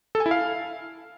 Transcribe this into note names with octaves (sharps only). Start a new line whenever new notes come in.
A4
G#5
E4
F5